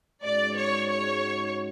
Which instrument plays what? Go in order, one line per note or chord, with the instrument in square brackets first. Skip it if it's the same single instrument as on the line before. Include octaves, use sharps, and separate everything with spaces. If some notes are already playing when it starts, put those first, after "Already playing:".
[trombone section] G#2 G#3 C#4 F#4 [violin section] D5
[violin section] C#5
C#5